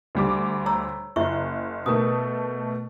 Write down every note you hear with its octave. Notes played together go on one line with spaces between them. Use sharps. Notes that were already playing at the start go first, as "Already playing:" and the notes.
D2 G3 D6
C#5 A#5 E6
F#1 E4 E5 C#6
B2 A3 A#4 D#6